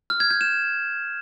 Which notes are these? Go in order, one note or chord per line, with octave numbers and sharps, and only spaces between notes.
F6
G#6
G6
E7